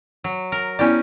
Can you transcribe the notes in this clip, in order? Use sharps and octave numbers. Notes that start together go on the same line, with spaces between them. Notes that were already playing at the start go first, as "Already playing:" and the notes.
F#3
A#4
B3 C#4 E4 G4 D5